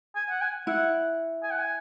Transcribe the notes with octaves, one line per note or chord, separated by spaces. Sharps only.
G#5
F#5
G#5
E4 F#5
G#5
F#5
G#5